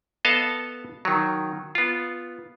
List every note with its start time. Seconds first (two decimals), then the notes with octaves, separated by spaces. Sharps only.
0.25 B3 A4 D#5 F5 A5
1.05 D#3 F#3
1.75 B3 F4